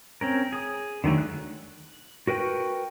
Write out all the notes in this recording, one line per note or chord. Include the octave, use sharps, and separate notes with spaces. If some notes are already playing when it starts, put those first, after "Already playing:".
C4 C#4 A#4
G#4 D#6
D3 D#3 F#3 A3
F#6
F#4 A#4 B4 G5 C#6